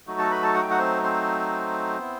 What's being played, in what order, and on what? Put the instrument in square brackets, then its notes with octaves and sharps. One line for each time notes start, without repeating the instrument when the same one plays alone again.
[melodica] F#3 A3 D#4 F#4
A4 A5
B4 B5
A4 A5
F#5
G5
F#4 F#5
C4 C5
C4 C5
B3 E4